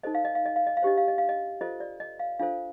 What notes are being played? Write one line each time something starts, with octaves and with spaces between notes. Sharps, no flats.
D#4 A4 C5 D#5
F5
D#5
F5
D#5
F5
D#5
F5
D4 G4 C5 D#5
F5
D#5
F5
D#5
F4 A4 C5 D#5
D5
D#5
F5
D4 F4 A4 C5 F5